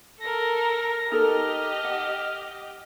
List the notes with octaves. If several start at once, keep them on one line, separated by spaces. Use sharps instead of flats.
A4 A#4 A#6
D#4 G4 A4 A#4 D#5 F6
F#5